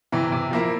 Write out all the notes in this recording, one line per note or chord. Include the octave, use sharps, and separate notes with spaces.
C3 E3
C3
F3 A#3 E4